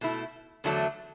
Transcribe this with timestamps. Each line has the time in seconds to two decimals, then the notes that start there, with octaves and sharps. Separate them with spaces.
0.01 B2 A3 E4
0.64 E2 D3 F#3 A3 D4